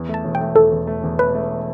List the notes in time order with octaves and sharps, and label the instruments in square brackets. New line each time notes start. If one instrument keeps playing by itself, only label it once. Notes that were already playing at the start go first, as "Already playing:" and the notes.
Already playing: [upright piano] E2
A3
[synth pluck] A5
[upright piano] E1
[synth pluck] G5
[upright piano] A3
[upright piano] E2 [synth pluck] A4
[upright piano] E2
A3
E2
[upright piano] E1 [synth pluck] B4
[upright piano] A3